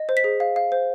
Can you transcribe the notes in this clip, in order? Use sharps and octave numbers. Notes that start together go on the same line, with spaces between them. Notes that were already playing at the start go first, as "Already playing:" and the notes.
Already playing: D#5
C5
B6
G#4
F5
F5
C5